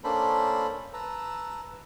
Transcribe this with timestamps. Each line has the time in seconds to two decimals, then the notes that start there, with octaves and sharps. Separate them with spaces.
0.04 A#3 C#4 D4 A4 C5 B5
0.94 B4 A5 A#5 E6